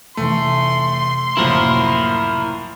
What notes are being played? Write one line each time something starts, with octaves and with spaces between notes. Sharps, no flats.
F1 E3 A3 C6
F#1 C2 A2 F3 F#3 A#3 E4 A#4